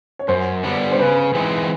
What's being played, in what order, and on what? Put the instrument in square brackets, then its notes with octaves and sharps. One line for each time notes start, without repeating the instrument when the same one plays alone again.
[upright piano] C#5
[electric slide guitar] F#2 [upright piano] C5
[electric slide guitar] D3 G3 B3 D4
[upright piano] C5
[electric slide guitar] C#3 [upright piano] B4
[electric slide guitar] E3 G#3 C4 D#4